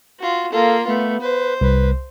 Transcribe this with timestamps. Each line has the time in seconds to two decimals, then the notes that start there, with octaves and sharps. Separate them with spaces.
0.20 F4 F#4
0.52 A#3 F4 A4
0.87 A3 B3
1.21 B4 C5
1.61 C2 B4